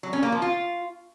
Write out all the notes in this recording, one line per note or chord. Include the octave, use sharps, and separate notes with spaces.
F#3
C#4
A#3
F3
F4